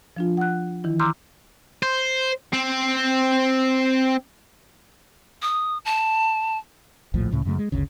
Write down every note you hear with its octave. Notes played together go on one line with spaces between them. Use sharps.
F3 D4 F4
F#5 F#6
D#3 E3 E4
A#5 C6 D6 E6 F6 G6
C5
C4
D#6
A5
A#1 D#2 A2 F3
C#2 A2 C#3
F#2 C#3 A3
G#3
G1 D2 C#3